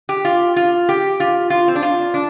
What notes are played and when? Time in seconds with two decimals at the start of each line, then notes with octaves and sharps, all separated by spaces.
0.09 G4
0.25 F4
0.56 F4
0.89 G4
1.20 F4
1.50 F4
1.68 C4
1.75 D4
1.82 F4
2.14 D4